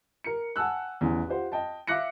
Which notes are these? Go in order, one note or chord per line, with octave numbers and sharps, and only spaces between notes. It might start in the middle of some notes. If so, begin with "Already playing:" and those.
A#4 C#7
F#5 G#5 A5 E6 F#6
A1 E2
F4 G4 C5 F#5
D#5 G5 A5
E5 F5 D6 F#6 A#6 C#7